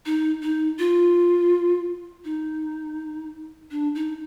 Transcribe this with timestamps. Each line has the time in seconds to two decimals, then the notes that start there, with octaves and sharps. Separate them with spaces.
0.06 D#4
0.42 D#4
0.79 F4
2.25 D#4
3.71 D4
3.95 D#4